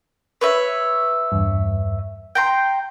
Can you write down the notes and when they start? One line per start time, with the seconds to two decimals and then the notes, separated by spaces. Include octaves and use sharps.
0.41 B4 C#5 E5
1.32 E2 G2
2.35 G5 A#5 C6 G6